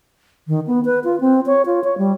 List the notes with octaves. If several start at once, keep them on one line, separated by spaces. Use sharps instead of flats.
D#3
B3
B4
F4
C4
C#5
F4
C#5
G3